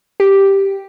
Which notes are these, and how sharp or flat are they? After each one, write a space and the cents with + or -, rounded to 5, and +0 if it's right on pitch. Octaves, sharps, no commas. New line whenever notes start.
G4 +0